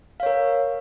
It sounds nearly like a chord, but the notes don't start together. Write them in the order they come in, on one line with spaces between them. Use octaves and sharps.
F5 C#5 A#4